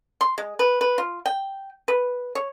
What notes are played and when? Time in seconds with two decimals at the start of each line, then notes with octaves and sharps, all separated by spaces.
0.21 C6
0.38 G#3
0.59 B4
0.81 B4
0.98 F4
1.26 G5
1.88 B4
2.35 C#5